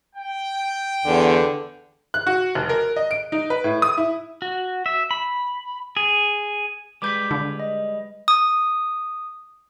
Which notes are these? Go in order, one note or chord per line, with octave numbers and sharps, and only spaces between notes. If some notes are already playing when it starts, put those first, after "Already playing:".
G5
E2 D3
F#6
F#4
F1
A#4
D#5
D7
D#4
B4
A2
D#6
E4
F#4
E5
B5
G#4
G3 G#3 B4 D6 G6 B6
D3
D#5
D#6